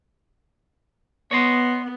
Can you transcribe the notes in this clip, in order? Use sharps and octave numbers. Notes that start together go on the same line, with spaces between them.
B3 C#5 D#5 C6